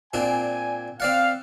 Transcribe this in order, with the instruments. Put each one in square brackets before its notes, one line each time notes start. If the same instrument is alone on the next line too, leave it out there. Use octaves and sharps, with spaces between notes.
[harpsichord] A#2 C4 D4 [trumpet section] G#5
[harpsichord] C4 D5 F#5 [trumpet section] F5